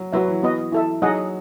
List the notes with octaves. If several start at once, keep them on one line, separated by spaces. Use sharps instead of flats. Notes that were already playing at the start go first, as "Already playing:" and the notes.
Already playing: F#3
F#3 F#4 B4 E5
E3
B3 F#4 B4 D#5
E4 A4 E5
F#3 D#4 G#4 D#5 F#5